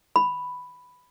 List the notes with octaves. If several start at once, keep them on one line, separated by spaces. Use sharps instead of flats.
B5